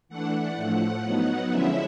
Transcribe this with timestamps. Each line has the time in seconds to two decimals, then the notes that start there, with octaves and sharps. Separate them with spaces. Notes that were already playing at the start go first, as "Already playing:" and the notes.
0.09 E3 A3 D4 F#5
0.55 A2 F3 A3
1.02 F#3 B3 D#4
1.50 D3 F3 G#3 C#4 E4 E5